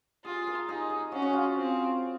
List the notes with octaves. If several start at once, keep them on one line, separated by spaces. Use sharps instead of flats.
F4 G#4
A#4
D#4 G#4
G#4
C#4 F#4
F#4
F4
C4